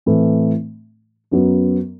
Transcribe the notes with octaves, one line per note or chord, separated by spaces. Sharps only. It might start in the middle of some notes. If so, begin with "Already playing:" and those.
A2 E3 A3 C4
F#2 F#3 B3